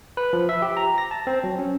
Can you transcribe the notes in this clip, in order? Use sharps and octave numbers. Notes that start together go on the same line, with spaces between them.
B4
F3
E5
G4
A#5
A#6
A5
C4
F#3
C#4